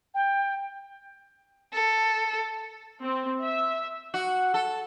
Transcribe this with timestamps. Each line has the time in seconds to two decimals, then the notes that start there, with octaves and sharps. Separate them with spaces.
0.14 G5
1.73 A4
3.01 C4
3.41 E5
4.14 F#4
4.54 A4